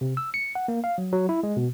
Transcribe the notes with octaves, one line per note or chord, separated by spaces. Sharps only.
C3
E6
C#7
F#5
A#3
F5
F#3
F#3
E4
G#3
B2